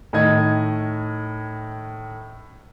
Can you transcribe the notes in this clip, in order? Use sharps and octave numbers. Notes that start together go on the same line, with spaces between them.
A2 D#3 D#5 G#6